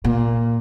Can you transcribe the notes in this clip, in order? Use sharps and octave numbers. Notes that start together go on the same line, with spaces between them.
A#2